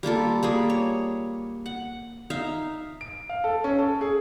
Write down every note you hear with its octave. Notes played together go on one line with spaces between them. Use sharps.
G3 A#3 F4 A4
G3 A#3 G#4
C#5
F#5
D#4 E5 F5
D7
F5
A4
C#4
A4
G#4